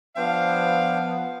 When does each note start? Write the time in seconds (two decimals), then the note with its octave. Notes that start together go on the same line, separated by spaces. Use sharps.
0.16 F3 B3 D4 C5 F5 G5